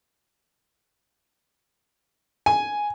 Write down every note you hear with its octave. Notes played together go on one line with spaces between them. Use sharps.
G#5